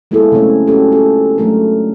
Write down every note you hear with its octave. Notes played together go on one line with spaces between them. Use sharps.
G#3 A#3 B3 E4 G#4 A4
C#3 F#3 A3 C4 C#4 C#5
C#4 F#4 G4 A4
F4 A4
F#3 G#3 A3 C#4 D4 A#4